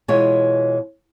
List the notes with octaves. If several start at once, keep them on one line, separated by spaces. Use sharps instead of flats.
B2 E3 G#3 F4 C#5